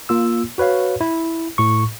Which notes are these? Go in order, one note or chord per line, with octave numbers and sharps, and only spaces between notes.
A#3 F4 E6
F#4 B4 C#5 F5
E4
A2 C#6